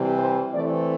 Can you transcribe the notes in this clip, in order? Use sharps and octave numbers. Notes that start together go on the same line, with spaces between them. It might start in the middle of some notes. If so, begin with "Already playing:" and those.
Already playing: C3 E3 G3 C4
C5
E3 A3 C4 D5